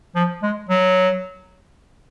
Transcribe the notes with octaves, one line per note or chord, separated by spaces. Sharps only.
F3
G#3
F#3